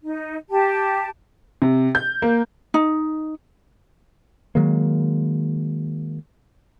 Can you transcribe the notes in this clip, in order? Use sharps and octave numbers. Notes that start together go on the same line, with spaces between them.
D#4
G4 A5
C3
G6
A#3
D#4
D#3 F#3 G#3 A#3